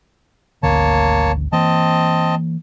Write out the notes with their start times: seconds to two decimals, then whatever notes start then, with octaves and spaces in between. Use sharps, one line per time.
0.63 G#1 D2 D3 A#3 C#5 A5
1.53 E3 A#3 C4 D#5 A5